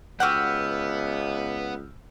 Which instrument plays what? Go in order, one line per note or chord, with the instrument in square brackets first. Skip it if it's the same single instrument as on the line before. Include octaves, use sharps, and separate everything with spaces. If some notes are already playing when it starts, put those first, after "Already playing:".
[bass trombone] C#2 [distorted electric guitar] B3 [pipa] F#4 G4 F#5 [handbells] E6 F6 G6